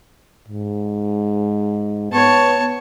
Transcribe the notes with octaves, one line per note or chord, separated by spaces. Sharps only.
G#2
B3 C#5 A5